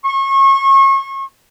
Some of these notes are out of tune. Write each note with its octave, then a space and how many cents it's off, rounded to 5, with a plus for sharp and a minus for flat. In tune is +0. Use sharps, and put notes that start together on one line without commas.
C#6 -30